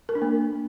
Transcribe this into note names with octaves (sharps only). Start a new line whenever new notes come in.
A#4
D4
A#3